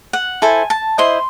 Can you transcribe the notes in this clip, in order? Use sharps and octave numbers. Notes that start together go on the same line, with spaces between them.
F#5
E4 A4 C5 G#5
A5
E4 C5 D#5 C6